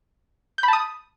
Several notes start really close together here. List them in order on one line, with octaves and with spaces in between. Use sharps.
G6 B5 A5 D#6